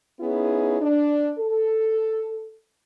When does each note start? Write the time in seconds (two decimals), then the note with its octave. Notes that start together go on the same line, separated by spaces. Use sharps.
0.20 B3 C#4 D#4 E4 G#4
0.80 D4
1.38 A4